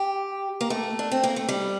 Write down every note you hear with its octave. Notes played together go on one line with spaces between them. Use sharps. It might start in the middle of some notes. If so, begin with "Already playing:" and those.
Already playing: G4
A#3
A3
D4
C4
A#3
A3
G3